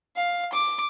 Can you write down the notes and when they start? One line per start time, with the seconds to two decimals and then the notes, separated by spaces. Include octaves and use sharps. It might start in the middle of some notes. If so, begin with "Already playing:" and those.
0.16 F5
0.53 D6